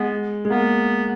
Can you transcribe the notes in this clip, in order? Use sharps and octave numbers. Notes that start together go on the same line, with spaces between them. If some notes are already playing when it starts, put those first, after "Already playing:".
Already playing: G#3 B3
G#3
A#3 B3